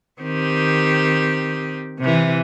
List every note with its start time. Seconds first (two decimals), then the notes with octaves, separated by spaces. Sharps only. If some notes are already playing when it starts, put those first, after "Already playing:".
0.21 D#3 C4 G4
1.99 C3 E3